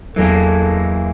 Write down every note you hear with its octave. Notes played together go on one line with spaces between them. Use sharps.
E2 E3 F#3 G#3 A#3 A4